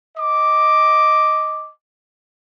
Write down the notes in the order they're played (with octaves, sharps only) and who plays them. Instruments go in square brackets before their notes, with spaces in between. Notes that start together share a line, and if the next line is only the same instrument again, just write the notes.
[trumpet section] D#5 D6